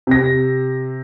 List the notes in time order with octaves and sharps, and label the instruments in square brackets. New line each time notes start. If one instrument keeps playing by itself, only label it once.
[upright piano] C3 A#6